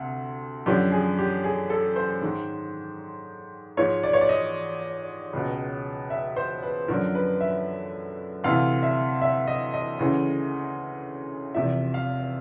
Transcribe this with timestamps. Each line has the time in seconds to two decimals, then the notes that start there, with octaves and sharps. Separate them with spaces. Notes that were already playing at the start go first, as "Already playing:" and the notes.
Already playing: D2 C3
0.66 F#2 D3 F3 G4
0.92 G#4
1.19 G4
1.44 G#4
1.70 A4
1.96 C5
2.22 G#2 D#3
3.77 G#2 F3 C#5
4.03 D5
4.13 C#5
4.21 D5
4.29 D#5
5.33 C#2 B2
6.10 E5
6.36 C5
6.63 B4
6.88 F#2 D3 F3 A#4
7.15 B4
7.41 E5
8.44 D2 C3 E3 F5
8.83 E5
9.22 E5
9.47 D#5
9.74 D#5
9.99 D2 C#3 E3
11.54 E2 C3 F3 E5
11.94 F5